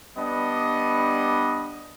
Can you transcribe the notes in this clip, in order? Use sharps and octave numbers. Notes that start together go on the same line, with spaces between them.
G3 B3 D4 D#5